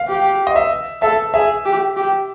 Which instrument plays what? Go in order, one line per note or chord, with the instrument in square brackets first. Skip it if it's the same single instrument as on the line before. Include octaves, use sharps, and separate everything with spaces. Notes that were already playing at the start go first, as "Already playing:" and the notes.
Already playing: [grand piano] F5
[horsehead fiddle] G4
[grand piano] D#5
E5
[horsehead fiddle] A4 [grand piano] E5
[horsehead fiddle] G#4 [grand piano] E5
[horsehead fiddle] G4
G4